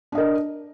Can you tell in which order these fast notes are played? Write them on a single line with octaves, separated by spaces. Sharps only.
D4 D#5 A#4